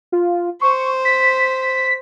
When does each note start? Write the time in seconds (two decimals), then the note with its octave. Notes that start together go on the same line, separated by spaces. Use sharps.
0.12 F4
0.61 C5 C#6
1.05 B6